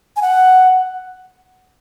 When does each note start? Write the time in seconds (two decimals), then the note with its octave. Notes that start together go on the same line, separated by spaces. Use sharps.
0.16 G#5
0.22 F#5